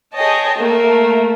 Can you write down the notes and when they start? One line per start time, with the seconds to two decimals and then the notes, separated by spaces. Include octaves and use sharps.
0.14 G#4 C#5 D#5 G5 A5
0.58 A3 A#3